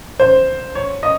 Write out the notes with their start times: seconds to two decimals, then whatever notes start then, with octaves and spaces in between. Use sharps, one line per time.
0.20 C5
0.75 C#5
1.03 D#5